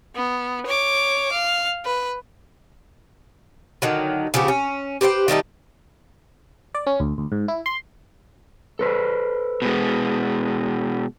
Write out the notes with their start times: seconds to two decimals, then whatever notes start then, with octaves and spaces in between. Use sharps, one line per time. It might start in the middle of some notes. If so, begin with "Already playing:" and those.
0.16 B3
0.66 C#5 D6
1.32 F5
1.85 B4
3.82 D3 D#3 F#3
4.34 C#3 F3 B3 G4
4.48 C#4
5.01 G4 B4 C5 G5
5.28 D#3 G3 A3 D#4
6.75 D5
6.87 C#4
7.00 D2
7.18 D2
7.32 G#2
7.48 E4
7.66 C6
8.79 A4 B4 C5
9.62 B2 G#3